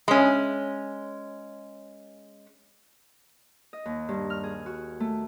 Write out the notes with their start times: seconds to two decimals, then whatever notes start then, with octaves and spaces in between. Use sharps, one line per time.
0.08 G#3 C#4
3.73 D#5
3.85 D#2
4.09 G2
4.30 F6
4.44 G#4
4.66 F#4
5.00 A3